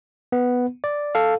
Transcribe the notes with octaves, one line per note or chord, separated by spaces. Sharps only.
B3
D5
A4 F5